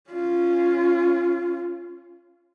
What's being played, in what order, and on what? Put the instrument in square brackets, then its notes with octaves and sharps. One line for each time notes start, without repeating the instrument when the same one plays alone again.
[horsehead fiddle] C#4 F4